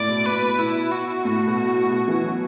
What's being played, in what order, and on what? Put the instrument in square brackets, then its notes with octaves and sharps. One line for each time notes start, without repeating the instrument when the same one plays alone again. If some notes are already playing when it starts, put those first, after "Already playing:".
Already playing: [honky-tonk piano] A2 [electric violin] D5
[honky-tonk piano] B2
[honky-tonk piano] A2 [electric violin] B4
[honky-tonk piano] A2
[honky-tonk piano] B2 [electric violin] E4
[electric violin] F#4
[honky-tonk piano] A2 [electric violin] F#4
[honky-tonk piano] B2
B2
E3
F#3